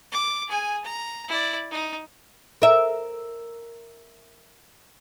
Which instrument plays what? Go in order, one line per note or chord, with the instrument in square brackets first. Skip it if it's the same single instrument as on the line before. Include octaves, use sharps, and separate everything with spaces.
[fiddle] D6
G#4 G#5
A#5
E4 D5
D#4
[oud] A#4 E5